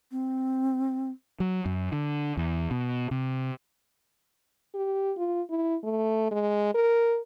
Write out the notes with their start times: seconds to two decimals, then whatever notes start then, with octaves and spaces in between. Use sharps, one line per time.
0.12 C4
1.40 F#3
1.65 F#2
1.92 D3
2.37 E2
2.71 B2
3.11 C3
4.75 G4
5.17 F4
5.50 E4
5.84 A3
6.31 G#3
6.74 A#4